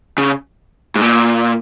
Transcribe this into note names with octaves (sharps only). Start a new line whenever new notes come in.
C#3
G#2
A#2